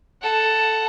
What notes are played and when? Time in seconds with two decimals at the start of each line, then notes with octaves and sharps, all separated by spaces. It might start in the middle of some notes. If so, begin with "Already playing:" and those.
0.23 A4 F#5